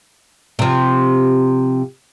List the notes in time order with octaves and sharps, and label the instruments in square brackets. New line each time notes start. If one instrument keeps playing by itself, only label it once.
[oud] C3 F3